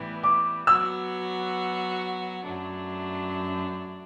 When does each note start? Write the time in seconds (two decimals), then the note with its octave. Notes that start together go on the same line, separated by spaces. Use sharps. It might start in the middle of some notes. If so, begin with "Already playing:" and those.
Already playing: A2 E3 G3 B3
0.23 D6
0.67 F#3 B3 F#4 E6
2.45 F#2 F#3 A3 D4